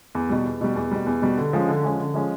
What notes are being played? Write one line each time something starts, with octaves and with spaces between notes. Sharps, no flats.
E2
B2 G3
E2
B2 G3
E2
B2 G3
E2
B2 G3
D3
F3 G#3 C#4
D3
F3 G#3 C#4
D3
F3 G#3 C#4